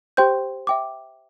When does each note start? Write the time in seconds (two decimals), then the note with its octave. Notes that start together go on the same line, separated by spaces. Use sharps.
0.17 G4 C5 G5 C6 G6
0.67 E5 G5 D6